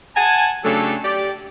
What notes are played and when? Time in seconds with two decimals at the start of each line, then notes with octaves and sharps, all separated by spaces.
0.15 F#5 G#5 A5
0.63 C#3 F#3 A3 D4 G4 A4
1.03 G4 D5